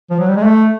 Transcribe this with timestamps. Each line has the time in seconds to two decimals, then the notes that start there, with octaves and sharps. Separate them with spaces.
0.10 F3
0.20 F#3
0.28 G3
0.36 G#3
0.44 A3